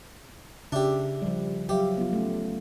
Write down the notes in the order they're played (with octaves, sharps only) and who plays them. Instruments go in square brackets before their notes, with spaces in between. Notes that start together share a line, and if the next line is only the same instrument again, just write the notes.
[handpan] C#3 E5 [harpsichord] D4 G4
[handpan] F3 G3
[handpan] F#3 E5 F5 [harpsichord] G4
[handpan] B3 F4
A3 C#4